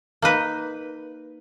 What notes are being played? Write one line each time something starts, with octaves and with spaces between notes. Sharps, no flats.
A#3 D#4 B4